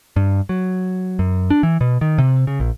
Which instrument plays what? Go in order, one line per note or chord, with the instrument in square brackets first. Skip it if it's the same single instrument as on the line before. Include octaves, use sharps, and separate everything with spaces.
[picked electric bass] G2
F#3
F#2
D4
E3
B2
D#3
C3
C#3
A#1